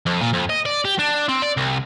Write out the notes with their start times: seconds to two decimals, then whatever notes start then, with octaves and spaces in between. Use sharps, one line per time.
0.06 F2
0.21 A#2
0.33 F2
0.50 D#5
0.66 D5
0.85 G4
0.99 D4
1.28 C4
1.42 D5
1.57 C2